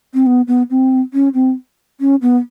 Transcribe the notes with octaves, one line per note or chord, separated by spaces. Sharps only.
C4
B3
B3
C4
C#4
C4
C#4
B3